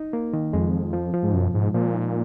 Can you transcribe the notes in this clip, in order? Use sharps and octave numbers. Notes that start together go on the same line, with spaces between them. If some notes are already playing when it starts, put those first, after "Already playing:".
Already playing: D#4
A#3
D#3
F2 G#3
F3
F3
F3
G#2
F#2 B2
G#2 G#3
A#2 F3
D#4